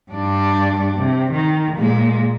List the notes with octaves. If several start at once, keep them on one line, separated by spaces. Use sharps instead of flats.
G2 D4
C3
D#3
A#2 G#3